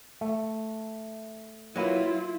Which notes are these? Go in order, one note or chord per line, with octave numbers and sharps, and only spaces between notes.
A3
F#3 A#3 E4 F4 B4